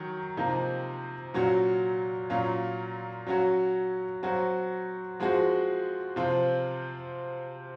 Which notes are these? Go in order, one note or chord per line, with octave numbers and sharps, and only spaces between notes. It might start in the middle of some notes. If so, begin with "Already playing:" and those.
Already playing: D#3 F#3
C3 F3 A#3 D#4
A#2 F#3 C#4 F#4
A#2 F#3 C#4 F4
F#3 C#4 F#4
F#3 C4 F#4
F3 G#3 C4 F#4
C3 F3 C4 F4